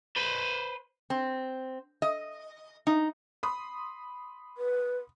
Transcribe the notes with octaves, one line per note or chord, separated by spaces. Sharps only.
B4 C5
C4
D#5
D#4
B5 C6 D#6
B4